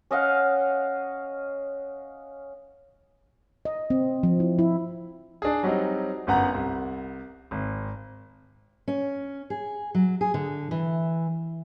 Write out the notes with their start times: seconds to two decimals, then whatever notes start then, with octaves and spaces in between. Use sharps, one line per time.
0.11 C#4 D#5 F5 F#5
3.65 D#5
3.90 C4
4.23 F3
4.40 E4
4.59 E4
5.42 D4 G#4
5.63 F#3 G3 C4 D#4
6.27 G1 F#2 B3 F#5 A#5
6.54 C2
7.51 G#1
8.88 C#4
9.50 G#4
9.94 F#3
10.21 G#4
10.34 D3
10.71 E3